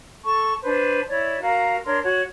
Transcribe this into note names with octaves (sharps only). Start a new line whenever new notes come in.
A4 A5 C#6
D4 B4 C5
E4 C#5 D5
F#4 A#4 F5 A#5
D4 A#4 C#5 C6
F#4 C#5